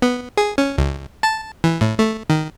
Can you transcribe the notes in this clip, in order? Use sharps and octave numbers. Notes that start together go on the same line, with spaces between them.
B3
G#4
C#4
C#2
A5
E3
A2
A3
D#3